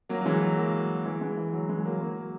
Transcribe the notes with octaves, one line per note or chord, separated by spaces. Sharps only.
F#3 A#3
F#3
E3 G#3
F#3
F#3 A#3
E3 G#3
E3 G#3
E3
F#3
E3 G#3
G#3
F#3 A#3
F#3 A#3